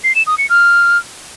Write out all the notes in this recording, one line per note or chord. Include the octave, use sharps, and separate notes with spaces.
C7
E7
D#6
C#7
F6